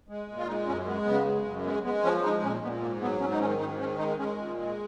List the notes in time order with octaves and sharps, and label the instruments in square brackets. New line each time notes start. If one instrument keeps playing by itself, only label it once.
[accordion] G#3
A#2
F4
G#3 D#4
F#2 C#4
G#3 B3
C#3 B3
G#3
F#2
G#3 B3
G#3 B3
F3 C#4
G#3 D#4
A#2 C#4
A#2 B3
G#2 A#3
F#3 B3
G#2 C#4
D#4
D#3 C#4
G#2 D#4
D#3 C#4
G#3 D#4
G#3 C#4
A#2
G#3